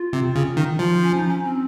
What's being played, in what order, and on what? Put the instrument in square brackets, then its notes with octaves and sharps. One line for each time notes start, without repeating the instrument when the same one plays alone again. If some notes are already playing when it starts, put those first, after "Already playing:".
Already playing: [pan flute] F4
[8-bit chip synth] C3
C#3
D#3
F3
[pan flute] C#4
D#4
C#4
C4